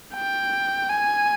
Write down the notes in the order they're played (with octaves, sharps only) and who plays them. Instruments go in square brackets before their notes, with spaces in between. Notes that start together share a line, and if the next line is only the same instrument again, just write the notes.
[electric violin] G5
G#5